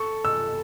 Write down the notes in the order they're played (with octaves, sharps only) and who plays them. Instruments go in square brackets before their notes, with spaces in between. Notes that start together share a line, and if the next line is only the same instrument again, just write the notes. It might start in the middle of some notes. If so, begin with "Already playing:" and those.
Already playing: [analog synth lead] A4 [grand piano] C#6
[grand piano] E6